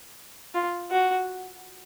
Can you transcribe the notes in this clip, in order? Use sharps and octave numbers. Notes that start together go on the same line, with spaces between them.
F4
F#4